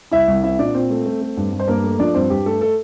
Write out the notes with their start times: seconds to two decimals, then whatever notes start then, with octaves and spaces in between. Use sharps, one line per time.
0.11 C2 E4 E5
0.28 C2
0.43 C4 E4 E5
0.59 A#2 D4 D5
0.74 A#2 C4 C5
0.90 A3
1.06 A3
1.21 A3
1.37 G2
1.53 G2
1.60 C5
1.68 G2 A#3 A#4
1.84 A3
1.99 F3 D4 D5
2.15 G2 C4 C5
2.30 G2 G4
2.46 A3 A4
2.61 A4